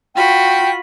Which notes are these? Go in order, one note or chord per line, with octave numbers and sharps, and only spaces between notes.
F4 F#4 G5 B5